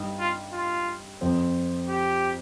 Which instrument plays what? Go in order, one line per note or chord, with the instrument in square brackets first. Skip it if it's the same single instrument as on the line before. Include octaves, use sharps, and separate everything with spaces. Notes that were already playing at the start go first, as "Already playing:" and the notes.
Already playing: [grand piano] G2 G3 D#4 G4
[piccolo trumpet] F4
F4
[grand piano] F2 F3 C4
[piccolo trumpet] G4